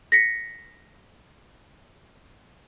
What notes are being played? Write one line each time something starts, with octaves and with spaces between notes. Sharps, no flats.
A#6 B6 C#7